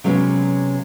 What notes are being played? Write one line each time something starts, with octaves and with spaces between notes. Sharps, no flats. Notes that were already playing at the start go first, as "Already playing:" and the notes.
C3 F#3 G#3 B3 C#4